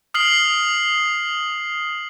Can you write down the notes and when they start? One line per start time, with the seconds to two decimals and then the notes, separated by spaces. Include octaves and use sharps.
0.14 D#6 F6 C7 F#7